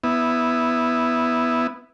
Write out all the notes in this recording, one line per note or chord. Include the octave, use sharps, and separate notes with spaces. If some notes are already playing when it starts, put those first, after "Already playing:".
B3 E4